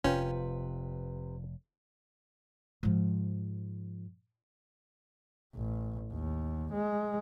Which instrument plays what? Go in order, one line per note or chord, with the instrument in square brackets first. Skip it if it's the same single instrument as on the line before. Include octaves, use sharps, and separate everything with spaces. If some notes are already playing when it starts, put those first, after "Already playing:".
[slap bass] F1 [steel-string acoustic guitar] C3 B4 [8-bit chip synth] C#4 [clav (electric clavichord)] F4 G5
[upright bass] G#2 F3
[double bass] A1
D#2
G#3